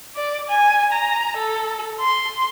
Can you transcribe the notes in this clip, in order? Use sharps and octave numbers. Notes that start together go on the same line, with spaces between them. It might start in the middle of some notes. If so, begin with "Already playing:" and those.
D5
G#5
A#5
A4
C6